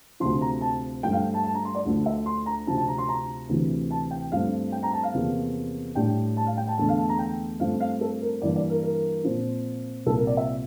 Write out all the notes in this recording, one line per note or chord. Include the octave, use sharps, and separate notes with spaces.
D2 C3 F3 C6
A#5
A5
G2 F3 A3 G5
F5
G5
A5
A5
A#5
C6
D5
D2 D3 F3 A3
E5
C6
A#5
D2 C3 F3 C4 A5
A5
A#5
C6
A#5
D2 C3 E3
A5
G5
G2 F3 A3 C4 F5
G5
A#5
A5
F5
E2 C3 F3 A#3
A2 G3 D4 G5
A5
F5
G5
A5
E2 D3 A3 D4 A5
F5
A5
A#5
G5
G2 F3 A3 C4 F5
F5
A4
A#4
G2 E3 A#3 D5
D5
A#4
A#4
A#2 F3 C4
C2 A#2 F3 C4 A4
A#4
D5
E5